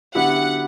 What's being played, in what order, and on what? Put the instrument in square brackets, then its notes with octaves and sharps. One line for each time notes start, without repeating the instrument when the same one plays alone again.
[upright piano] D3 F#3 B3 E4 G4 [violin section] F#5